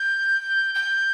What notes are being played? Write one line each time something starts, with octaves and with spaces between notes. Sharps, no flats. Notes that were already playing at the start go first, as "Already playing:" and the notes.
Already playing: G6
G6